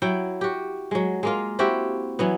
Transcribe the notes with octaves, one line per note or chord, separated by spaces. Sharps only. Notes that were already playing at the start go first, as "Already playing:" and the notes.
F#3 E4 G5
F#4 G4
F#3 G#3
G#3 A#3 F4
C4 E4 F#4 G4
E3 F#3 B3